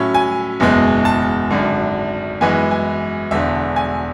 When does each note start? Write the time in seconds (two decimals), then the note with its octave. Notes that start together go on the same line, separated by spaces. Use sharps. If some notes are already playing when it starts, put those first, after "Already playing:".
Already playing: A2 F#3 C#4 E5
0.14 G#5
0.60 F#1 E2 B2 G#3
1.05 A5
1.50 G#1 F#2 D3
2.41 F#2 E3 G#3 B3 G#5
2.71 G#5
3.31 E1 E2 D3 E5
3.76 G#5